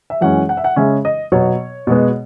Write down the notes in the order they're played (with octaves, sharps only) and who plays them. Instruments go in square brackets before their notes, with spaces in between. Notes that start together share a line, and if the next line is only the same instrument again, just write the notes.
[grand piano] E5
F#2 E3 G#3 C#4 F#5
F#5
E5
F#5
C#3 G#3 C#4 E5
D#5
B2 F#3 B3 C#5
B2 G#3 B3